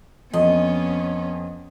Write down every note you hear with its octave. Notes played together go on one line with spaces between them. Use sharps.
F2 B3 C#4 D#5